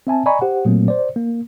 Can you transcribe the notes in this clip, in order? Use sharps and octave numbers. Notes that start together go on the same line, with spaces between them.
C4 E5 G#5 A5
D5 D#5 G#5 A#5 B5 C#6
G4 C5 F#5
A#2 F#3 A3 A#3 C4
C5 D5
A#3